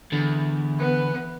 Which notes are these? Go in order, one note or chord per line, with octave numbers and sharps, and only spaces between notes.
E2 D3
B3